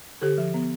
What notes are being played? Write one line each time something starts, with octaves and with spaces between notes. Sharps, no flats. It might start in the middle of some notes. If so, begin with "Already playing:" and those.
D3 G4 A4
F3
B3